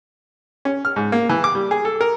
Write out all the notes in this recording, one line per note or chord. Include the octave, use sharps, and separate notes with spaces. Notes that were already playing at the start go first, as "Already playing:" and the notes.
C#4
F6
G#2
A#3
E3
D6
G3
G#4
A4
A#4